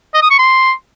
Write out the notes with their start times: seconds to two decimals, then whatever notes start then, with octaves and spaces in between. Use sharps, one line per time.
0.14 D#5
0.22 D#6
0.30 C#6
0.39 C6